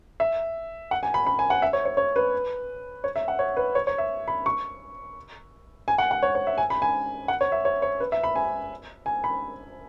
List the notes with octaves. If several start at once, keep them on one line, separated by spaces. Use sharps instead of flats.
E5
F#5
G#5
B5
B5
G#5
F#5
E5
C#5
C#5
C#5
B4
C#5
E5
F#5
C#5
B4
C#5
C#5
E5
B5
C#6
G#5
F#5
F#5
C#5
C#5
E5
G#5
B5
G#5
F#5
C#5
E5
C#5
C#5
B4
E5
B5
G#5
G#5
B5